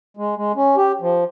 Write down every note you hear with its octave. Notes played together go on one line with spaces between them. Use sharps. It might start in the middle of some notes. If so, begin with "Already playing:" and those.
G#3
G#3
C#4
G4
F3